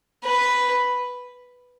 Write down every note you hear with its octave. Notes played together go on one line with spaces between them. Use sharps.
B4